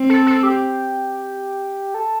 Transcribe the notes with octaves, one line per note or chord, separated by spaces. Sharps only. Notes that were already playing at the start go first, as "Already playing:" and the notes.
Already playing: C4
A4
A4
G4
A4